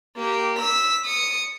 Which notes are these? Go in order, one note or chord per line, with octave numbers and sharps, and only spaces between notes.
A#3 G4
E6 B6
D#6 C#7